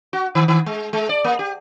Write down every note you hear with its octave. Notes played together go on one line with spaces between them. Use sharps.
F#4
D#3
D#3
G#3
G#3
D5
A#3
G4